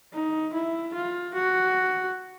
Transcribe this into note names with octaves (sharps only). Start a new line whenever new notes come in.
D#4
E4
F4
F#4